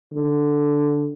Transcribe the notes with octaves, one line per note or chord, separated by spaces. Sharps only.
D3